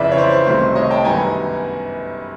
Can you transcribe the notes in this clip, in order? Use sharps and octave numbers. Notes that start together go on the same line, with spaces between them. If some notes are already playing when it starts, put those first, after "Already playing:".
Already playing: F2 C#3 E3 D5 E5
C#5
C5 D5
C5
C2 C3 D#3 F#3 A3 C5
C#5 D#5
G5 A5
G1 F#2 D#3 G3 B3 G#5 A#5